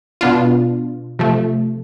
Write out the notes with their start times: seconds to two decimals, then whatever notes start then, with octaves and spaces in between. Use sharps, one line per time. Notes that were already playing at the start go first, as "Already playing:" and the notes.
0.21 B2 B3 D4 F4
1.19 C3 F3 A3